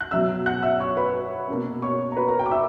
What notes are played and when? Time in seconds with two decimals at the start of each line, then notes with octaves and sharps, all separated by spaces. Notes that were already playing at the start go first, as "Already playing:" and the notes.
0.01 F#6
0.11 B2 F#3 C#4 E5 E6
0.46 F#5 F#6
0.63 E5 E6
0.80 C#5 C#6
0.97 B4 B5
1.48 B2 A#3 C#4
1.82 C#5 C#6
2.12 A#5
2.17 B4 B5
2.28 A#4 A#5
2.39 G5
2.46 D6
2.51 E5 E6